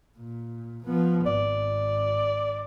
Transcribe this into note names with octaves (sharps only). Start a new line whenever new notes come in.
A#2
F3 B3
G#1 D5